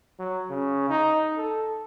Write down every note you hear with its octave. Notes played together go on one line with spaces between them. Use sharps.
F#3
C#3
D#4
A4